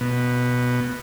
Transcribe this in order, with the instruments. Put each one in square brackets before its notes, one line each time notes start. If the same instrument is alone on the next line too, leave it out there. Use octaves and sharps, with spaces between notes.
[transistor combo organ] B2